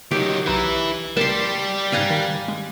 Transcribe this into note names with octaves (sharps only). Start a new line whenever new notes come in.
D#3 F#3 G4
B1 E3 E4 A#5 F#6
G3 G4 A#4 A5 C6
G#2 F5 G#5 A#5 F#6 A6
D#3
G#3